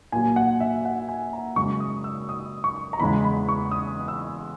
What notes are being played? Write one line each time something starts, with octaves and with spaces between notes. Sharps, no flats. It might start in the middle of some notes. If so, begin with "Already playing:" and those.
A#2 F#3 G#5
F#5
E5
F#5
G#5
A#5
F#2 C#3 G#3 C#6
D#6
E6
D#6
C#6
A#5
E2 C#3 G#3 B5
B5
C#6
D#6
E6